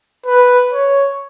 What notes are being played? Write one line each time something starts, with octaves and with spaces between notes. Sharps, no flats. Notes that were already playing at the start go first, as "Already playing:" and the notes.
B4
C#5